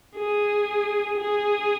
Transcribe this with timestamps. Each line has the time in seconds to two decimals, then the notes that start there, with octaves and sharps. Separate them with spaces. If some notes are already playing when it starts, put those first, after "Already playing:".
0.16 G#4
1.18 G#4